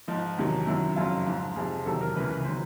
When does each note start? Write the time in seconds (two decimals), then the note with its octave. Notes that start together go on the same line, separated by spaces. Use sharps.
0.08 G#2 F3 D#4
0.38 E2 C3 D#3 F#3
0.66 F#2 D#3 F#3 E4
0.96 F2 C#3 F#3 F4
1.26 G#2 F3
1.56 F2 C3 F3 G#4
1.85 E2 C3 D#3 F#3 A4
2.01 A#4
2.16 C#2 C#3 E3 B4
2.45 D#3 F#3 C5